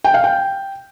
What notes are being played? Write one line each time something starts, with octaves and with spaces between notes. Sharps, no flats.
G5
F5
G5